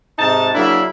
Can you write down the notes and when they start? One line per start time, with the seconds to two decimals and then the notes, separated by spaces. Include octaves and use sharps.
0.18 G#2 C3 D#4 A5
0.55 C#3 F#3 A#3 D4 E4